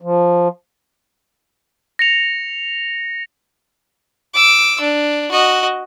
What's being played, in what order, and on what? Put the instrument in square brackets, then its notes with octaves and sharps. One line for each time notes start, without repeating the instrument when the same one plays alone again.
[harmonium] F3
[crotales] A#6 C#7 F7
[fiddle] D6 E6
D4
F#4 D#5